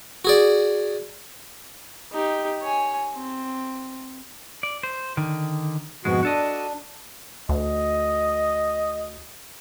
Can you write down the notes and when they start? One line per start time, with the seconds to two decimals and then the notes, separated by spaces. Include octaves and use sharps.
0.25 F#4 G#4 D5
2.12 D#4 G4
2.62 C#5 G#5
3.15 C4
4.63 D5
4.83 C5
5.17 D3 D#3
6.05 F2 G#2 B2 G#3 B3 F#4
6.23 D4 F#4 A4 D#5
7.49 D2 D#5